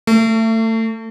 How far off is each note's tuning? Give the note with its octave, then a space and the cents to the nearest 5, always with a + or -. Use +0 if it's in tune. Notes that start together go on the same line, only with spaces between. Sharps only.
A3 +30